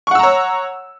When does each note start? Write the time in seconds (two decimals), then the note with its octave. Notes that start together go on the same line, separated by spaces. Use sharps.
0.07 C#6
0.11 F#5
0.15 E6
0.19 A#5
0.23 C#5